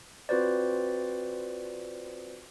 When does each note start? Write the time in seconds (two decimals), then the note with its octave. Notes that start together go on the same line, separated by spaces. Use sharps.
0.29 C4 F4 F#4 B4 C5 D5